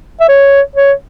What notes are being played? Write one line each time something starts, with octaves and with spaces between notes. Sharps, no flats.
E5
C#5
C#5